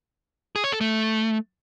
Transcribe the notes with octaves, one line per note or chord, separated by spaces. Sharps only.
G#4
C#5
A4
A3